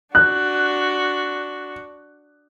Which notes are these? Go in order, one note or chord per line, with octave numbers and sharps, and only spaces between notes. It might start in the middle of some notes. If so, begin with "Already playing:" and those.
D4 F#4 F#6